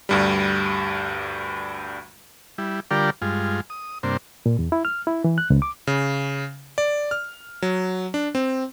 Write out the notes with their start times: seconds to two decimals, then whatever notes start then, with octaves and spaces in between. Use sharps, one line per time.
0.09 D2 G2 G3
2.58 G3 E4
2.91 D3 G3 F4 G4 A#4 D5
3.22 G2 G#3 F4
3.70 D#6
4.03 G2 C3 A#3 D4 C5
4.46 A#2
4.59 E2
4.72 E4
4.85 F6
5.07 E4
5.24 E3
5.38 F#6
5.50 C#2
5.62 D6
5.87 C#3
6.78 D5
7.11 F6
7.62 F#3
8.14 D4
8.35 C4